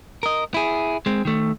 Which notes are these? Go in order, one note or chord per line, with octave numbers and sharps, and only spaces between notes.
A#4 D#5
E4 G#4
G#3 C4
D#3 A3